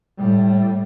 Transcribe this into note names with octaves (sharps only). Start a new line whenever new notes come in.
A2 G3